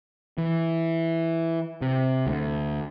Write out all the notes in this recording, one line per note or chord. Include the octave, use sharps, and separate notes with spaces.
E3
C3
D2